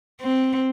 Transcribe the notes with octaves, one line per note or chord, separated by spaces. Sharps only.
C4